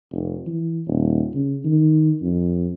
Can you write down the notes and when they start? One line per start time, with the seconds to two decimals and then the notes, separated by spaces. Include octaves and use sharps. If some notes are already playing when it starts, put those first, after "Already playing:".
0.11 F1
0.46 E3
0.87 D#1
1.34 C#3
1.65 D#3
2.22 F2